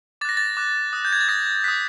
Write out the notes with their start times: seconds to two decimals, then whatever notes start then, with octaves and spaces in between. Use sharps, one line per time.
0.21 D6 A6
0.25 F#6 A#6
0.37 A6
0.57 D6 F#6
0.93 D#6 F#6
1.05 G6
1.13 G#6
1.21 A6
1.28 D#6 F#6 A#6
1.64 D#6 F#6 B6